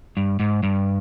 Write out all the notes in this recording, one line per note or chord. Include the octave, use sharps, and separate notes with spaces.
G2
G#2
G2